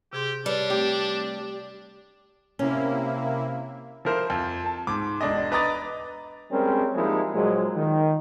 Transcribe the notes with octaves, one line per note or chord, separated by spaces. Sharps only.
C3 G4 G#4 C6
G3 D4 B4 C#5
A3 C4 G4
C3 A#3 C#4 E4
F3 E4 A#4 C5
F2
A5
G#2 D6
E1 D4 D5 D#5
B4 D#5 A#5 D6 D#6 A6
G3 G#3 C4 C#4 A#4
F3 G3 G#3 A#3 D#4 E4
A#2 F3 F#3 G#3
D#3